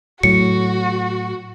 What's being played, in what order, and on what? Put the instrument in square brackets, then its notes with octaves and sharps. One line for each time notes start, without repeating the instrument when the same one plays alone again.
[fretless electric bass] A2 F#3 [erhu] F#4 [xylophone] C#7